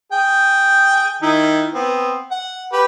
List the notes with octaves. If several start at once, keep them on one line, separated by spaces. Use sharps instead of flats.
G#4 G5
D#3 D#4 E4
B3 C4
F#5
G4 B4